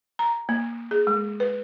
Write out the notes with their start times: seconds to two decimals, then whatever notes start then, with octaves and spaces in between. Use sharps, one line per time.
0.19 A#5
0.49 A#3
0.91 G#4
1.07 G#3
1.40 B4